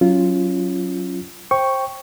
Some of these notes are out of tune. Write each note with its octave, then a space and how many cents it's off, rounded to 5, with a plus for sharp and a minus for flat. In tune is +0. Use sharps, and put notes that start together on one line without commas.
F#3 +0 C#4 +0 F4 -10
C5 +25 G5 +0 C#6 +0